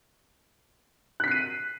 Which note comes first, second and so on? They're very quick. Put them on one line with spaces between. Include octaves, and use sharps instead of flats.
F#6 B6 C7 D#7